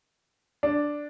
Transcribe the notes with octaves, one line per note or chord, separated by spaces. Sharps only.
D4